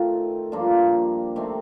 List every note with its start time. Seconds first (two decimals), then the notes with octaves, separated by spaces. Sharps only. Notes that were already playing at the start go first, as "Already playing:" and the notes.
Already playing: D#3 A3 C4 F4
0.52 G2 F3 A#3 D4
1.36 C3 D#3 A3 C4